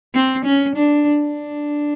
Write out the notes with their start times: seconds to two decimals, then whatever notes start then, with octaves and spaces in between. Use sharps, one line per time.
0.14 C4
0.45 C#4
0.75 D4
1.20 D4